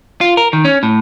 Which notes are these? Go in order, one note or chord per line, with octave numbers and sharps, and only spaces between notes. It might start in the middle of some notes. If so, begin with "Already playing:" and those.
F4
A#4
D#3
C#4
A2